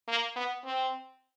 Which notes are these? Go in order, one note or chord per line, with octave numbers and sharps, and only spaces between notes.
A#3
B3
C4